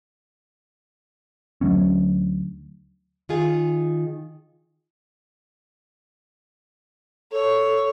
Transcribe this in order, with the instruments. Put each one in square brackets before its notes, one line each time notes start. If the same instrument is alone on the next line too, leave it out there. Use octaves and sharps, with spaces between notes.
[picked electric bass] D2 F#3 B3 C#4
[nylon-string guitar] D#3 F4 G#4
[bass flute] A4 [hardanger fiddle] C#5